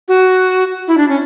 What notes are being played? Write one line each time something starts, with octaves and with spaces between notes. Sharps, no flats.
F#4
E4
D4
C#4